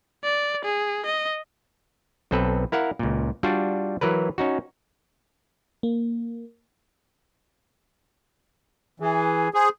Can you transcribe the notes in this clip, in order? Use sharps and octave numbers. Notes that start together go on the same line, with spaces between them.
D5
G#4
D#5
B1 C4 A4 B4
E4 A#4 F5 F#5
C#2 A#2
G3 D4 F4 F#4
E3 F#3 A#4 B4
C#4 D#4 F#4
A#3
E3 G#4
G#4 C5